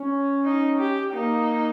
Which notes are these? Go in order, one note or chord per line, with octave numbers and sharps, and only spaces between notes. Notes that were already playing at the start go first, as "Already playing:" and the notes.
Already playing: C#4
D#4
G4
A#3 D#4